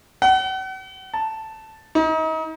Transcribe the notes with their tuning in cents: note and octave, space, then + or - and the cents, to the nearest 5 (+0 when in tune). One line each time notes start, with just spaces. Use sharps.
F#5 +40
A5 +0
D#4 +35